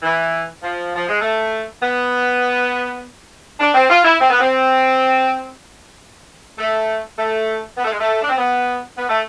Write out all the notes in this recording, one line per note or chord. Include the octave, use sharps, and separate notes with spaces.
E3
F3
F3
G#3
A3
B3
D4
C4
F4
E4
C4
B3
C4
A3
A3
B3
A3
G#3
A3
D4
C4
B3
B3
A3